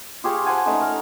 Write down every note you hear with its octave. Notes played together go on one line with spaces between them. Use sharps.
F4 G4 G#4 C#5
C5 F#5 G#5 A5
A3 C#4 D#4 C#5
A#4 A#5